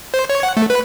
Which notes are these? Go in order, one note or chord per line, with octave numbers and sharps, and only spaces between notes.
C5
C#5
F#5
A3
B4